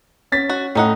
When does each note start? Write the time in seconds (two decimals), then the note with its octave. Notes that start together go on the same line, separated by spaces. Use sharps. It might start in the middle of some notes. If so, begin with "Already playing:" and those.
0.32 C#4 A6 B6
0.50 F#4
0.75 A2 C#4 D#4 F#5